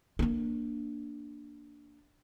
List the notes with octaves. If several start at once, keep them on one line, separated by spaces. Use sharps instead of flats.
A#3 D4